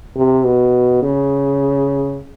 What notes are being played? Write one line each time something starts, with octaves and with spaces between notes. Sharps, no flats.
C3
B2
C#3